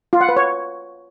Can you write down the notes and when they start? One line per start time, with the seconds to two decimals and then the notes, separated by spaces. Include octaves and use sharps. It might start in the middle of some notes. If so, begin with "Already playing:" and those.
0.13 F4
0.21 F#5
0.29 B4
0.36 C#5